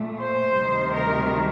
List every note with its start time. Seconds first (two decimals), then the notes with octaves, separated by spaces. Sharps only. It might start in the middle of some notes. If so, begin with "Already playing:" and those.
Already playing: A#2 A3
0.20 C5
0.57 D2 C3 D#3 G3
0.95 A#4